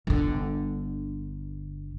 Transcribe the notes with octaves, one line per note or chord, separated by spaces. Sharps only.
G1 D3